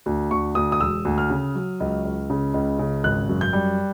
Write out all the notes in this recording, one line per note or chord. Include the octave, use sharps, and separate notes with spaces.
D2
D2 C#6
D2 D#6
D#6
E1 E6
D2
F6
C#3
F#3
C#2
C#2
C#3
C#2
C#3
G#1 F#6
F#2
G6
G3